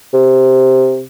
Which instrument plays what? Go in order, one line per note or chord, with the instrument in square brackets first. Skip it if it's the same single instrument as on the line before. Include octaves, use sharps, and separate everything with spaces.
[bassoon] C3